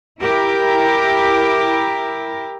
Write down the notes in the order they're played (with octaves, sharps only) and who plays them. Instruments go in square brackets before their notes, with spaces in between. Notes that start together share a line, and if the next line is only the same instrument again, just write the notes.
[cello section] E4 G4 A#4